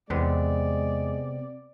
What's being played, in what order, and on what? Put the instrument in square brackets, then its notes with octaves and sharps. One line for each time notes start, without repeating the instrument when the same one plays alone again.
[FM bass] E2 [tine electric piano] C3 B3 C4 [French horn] G#3 [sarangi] D5